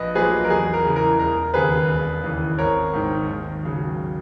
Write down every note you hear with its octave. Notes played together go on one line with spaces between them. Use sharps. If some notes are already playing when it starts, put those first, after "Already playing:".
Already playing: A#1 B4 D#5
A#2 F#3 G#4 B4
A#4
E2 G#4
A#4
C#3 E3
A#4
E1 A#4
D#2 C#3 G#4 B4
E1
D#2 C#3 E3
G#1 A#4 C#5
G#2 D#3
D#2
C#3 F#3